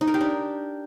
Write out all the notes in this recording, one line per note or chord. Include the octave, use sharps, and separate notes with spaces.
D#4
A#4
G4
D4